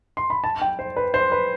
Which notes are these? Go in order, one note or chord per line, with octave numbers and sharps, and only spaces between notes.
C6
B5
A5
G5
C5
B4
C5
B4